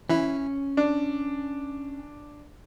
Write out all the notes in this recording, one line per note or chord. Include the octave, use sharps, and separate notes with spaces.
E3 C#4 E4
D4